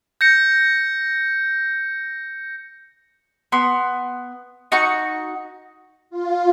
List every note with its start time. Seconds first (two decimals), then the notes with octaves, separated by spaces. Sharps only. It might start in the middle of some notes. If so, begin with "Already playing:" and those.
0.21 G6 A#6 C#7
3.52 B3 C6
4.72 D#4 F#4 C#6
6.10 F4